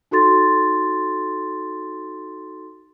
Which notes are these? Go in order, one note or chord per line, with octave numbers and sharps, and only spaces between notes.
D#4 F#4 A4 C6 A6